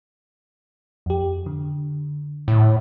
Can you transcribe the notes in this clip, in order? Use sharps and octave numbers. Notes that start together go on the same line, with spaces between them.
F2 G4
D3
A2